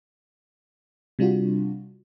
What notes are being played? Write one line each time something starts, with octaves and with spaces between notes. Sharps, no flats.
C3 G3 D4 F4 F#4